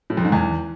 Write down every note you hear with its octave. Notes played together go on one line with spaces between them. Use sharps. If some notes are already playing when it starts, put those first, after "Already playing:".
A2
F2
G#2
E2